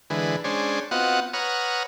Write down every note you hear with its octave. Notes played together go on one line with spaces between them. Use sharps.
D3 E3 G#3 B4
G#3 C#4 D4 C5
B3 C4 F4 F#4 D#5 F#5
B4 C#5 F#5 A#5 D#6 F6